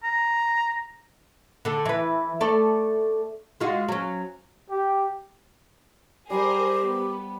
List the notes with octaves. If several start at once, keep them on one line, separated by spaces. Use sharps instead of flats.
A#5
D3 A4
E3 B4
A3 A4 D5
G#3 F4 F#4
F#3 C#4
G4
G3 G4 G#4 A#4 C5
B3